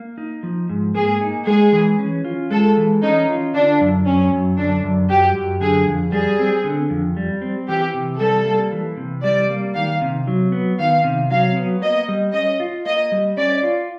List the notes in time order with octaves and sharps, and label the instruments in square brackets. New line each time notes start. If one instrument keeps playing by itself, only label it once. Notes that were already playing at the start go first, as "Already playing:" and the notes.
Already playing: [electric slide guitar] A#3
D#4
F3
G#2
[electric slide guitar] A#3 [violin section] G#4
[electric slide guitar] D#4
[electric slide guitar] G#3 [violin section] G#4
[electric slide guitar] E3
C#4
F4
[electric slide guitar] G#3 [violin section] A4
[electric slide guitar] E3
[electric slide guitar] C#4 [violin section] D#4
[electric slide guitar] F4
[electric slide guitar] D3 [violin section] D4
[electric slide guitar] F#2
[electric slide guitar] F#3 [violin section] C#4
[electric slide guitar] F#2
[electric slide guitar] D3 [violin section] D4
[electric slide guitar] F#2
[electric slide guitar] F#3 [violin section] G4
[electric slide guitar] F#2
[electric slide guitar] D3 [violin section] G#4
[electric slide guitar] F2
[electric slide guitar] G3 [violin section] G#4
[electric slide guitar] C4
D3
F2
G3
C4
[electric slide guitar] E3 [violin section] G4
[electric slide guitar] C3
[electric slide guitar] G3 [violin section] A4
[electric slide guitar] A#3
E3
C3
[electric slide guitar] G3 [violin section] D5
[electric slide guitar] A#3
[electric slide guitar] D#3 [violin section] F5
[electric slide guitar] C3
F#3
B3
[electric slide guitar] D#3 [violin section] F5
[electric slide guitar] C3
[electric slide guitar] F#3 [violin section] F5
[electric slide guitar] B3
[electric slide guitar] A#3 [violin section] D#5
[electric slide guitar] G3
[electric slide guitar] C#4 [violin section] D#5
[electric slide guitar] F4
[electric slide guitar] A#3 [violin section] D#5
[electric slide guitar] G3
[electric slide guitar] C#4 [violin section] D5
[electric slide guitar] F4